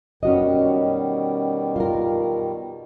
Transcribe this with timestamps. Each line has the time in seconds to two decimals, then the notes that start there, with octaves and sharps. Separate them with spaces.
0.23 B2 D#3 G3 C#4 F#4 D#5
1.76 F4 A#4